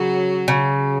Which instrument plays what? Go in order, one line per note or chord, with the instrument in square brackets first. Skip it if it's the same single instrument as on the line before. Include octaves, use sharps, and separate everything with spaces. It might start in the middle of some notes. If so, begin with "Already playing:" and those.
Already playing: [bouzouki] C#3 [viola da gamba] F#3 F#4
[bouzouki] C#3